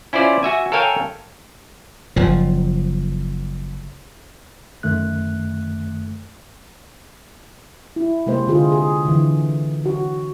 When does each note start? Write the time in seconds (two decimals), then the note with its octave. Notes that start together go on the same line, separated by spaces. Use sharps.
0.13 C#4 E4 F4 C5 D5
0.43 F#4 E5 G#5
0.72 A4 A#4 C#5 F5 G5 G#5
2.16 F#1 F3
4.83 F#2 D#3 A3 F#6
7.96 E4
8.26 C3 G#3 A#3 C5
8.47 D3 F4 G#4
8.72 G#4
9.05 D3 E3
9.86 F#4